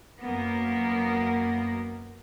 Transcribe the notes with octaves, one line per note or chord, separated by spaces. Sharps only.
F#2 A#3 B3